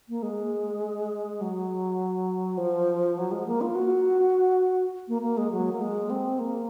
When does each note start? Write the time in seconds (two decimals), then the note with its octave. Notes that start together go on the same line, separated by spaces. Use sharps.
0.09 A#3
0.23 G#3
1.41 F#3
2.58 F3
3.17 F#3
3.32 G#3
3.47 A#3
3.61 F4
3.75 F#4
5.08 A#3
5.22 A#3
5.37 G#3
5.51 F#3
5.73 A#3
5.81 G#3
6.10 C4
6.39 A#3